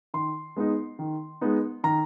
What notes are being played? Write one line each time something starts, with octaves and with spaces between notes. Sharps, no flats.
D#3 C6
G#3 B3 D#4
D#3
G#3 B3 D#4
D#3 A#5